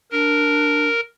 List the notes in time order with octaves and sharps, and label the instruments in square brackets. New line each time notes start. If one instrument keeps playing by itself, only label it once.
[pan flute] D4 [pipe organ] A#4